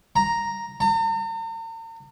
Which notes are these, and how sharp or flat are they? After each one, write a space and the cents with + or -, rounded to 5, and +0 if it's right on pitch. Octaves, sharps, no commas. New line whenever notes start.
A#5 +0
A#5 -45